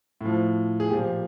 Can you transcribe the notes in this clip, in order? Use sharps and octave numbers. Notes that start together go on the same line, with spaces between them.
A2 F3
G#4
A#2 F3 G4